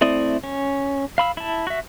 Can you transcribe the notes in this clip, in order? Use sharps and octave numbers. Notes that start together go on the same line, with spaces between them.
A3 C4 E4 D5 D#6
C#4
F5 B5 E6
E4 A5
F#4 E5